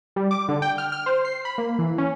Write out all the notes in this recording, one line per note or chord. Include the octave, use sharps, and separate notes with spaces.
G3
D6
D3
G5
F6
F6
C5
C7
B5
A#3
E3
C#4